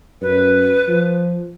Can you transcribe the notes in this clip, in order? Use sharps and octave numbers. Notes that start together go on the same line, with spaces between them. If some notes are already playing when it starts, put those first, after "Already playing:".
F#2 B4
F3